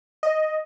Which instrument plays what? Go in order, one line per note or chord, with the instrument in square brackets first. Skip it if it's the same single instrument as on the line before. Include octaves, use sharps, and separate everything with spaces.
[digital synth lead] D#5